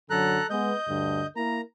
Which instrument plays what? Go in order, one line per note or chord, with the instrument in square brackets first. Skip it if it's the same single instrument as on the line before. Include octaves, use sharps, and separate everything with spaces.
[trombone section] F#2 D3 F#3 [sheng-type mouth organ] A4 A#5 F#6
[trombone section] G#3 B3 [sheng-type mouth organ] D#5 G6
[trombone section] D2 G2 D3
[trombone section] A#3 E4 A#4 [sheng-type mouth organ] A#5